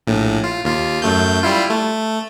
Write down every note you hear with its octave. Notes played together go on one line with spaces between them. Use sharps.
A#1 A2
F4
D#2 F4
F#2 A3 G6
G3 E4 F4
A3